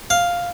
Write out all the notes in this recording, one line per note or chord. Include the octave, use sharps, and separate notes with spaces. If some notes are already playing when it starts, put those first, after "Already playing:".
F5